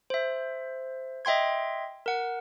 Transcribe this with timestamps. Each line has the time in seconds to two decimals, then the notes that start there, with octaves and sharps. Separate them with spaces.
0.10 C5 E5
1.25 D#5 E5 G5 C6 G#6
2.06 A#4 F#5